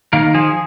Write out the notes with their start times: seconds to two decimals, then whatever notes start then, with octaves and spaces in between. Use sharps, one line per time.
0.13 D#3 A#3 A#4
0.34 F3 G#4